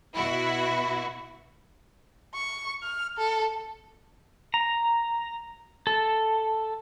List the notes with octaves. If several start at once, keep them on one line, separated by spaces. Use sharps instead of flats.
B2 E4 F#4
C#6
F6
A4
A#5
A4